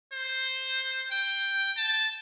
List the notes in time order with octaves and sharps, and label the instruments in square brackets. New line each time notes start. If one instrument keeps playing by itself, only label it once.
[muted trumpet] C5
G5
A5